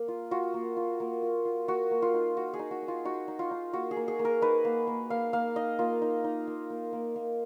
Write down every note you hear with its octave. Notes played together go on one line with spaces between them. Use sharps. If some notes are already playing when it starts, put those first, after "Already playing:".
Already playing: A#3
F4
F4 F#4
A#3
F4
A#3
F4
F4
A#3 F#4
A#3
F4
D#4
D#4 F#4
G#4
D#4
F#4
D#4
F4
D#4 F#4
D#4
F4
D#4
A#3 F#4
G#4
A#3
G#4
A#3
A#4
D#4 B4
A#3
A#3
A#3 F5
A#3 F5
D#4 D#5
A#3 F4
D#4
D#4
A#3
A#3
A#3
A#3